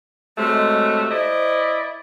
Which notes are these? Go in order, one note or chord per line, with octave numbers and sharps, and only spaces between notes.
C3 F#3 G#3 A3
E4 C5 D5 D#5